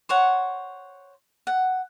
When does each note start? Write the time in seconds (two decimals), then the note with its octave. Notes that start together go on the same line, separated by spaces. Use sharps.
0.09 C5 C#5 F#5
1.47 F#5